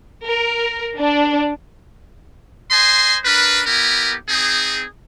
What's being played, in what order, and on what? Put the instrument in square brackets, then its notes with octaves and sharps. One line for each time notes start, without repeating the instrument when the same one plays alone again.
[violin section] A#4
D4
[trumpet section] C5 D#5 G#5 C6
D4 A#4 B4
B3 E4 G4 A#4
C4 D#4 G#4